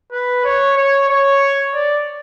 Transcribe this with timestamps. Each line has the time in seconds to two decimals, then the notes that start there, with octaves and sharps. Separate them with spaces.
0.12 B4
0.44 C#5
0.77 C#5
1.09 C#5
1.74 D5